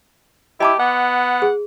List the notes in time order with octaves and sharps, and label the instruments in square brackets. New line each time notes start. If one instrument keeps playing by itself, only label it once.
[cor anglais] E4 [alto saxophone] G4 [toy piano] D#5 A5 D6
[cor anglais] B3 [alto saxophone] F#5
[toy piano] G#4